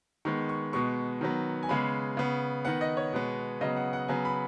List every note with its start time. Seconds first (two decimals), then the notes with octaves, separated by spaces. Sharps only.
0.25 D#3 G#3 B3 C#6
0.49 C#6
0.73 B2 G#3 B3 C#6
1.21 D#3 F#3 B3
1.63 G#5
1.69 C#3 G#3 B3 B5
2.17 C#3 B3
2.65 D#3 B3 F#5
2.81 D#5
2.97 C#5
3.13 B2 G#3 B3
3.61 C#3 F#3 B3 D#5
3.76 F#5
3.93 F#5
4.08 C#3 F#3 B3 G#5
4.25 B5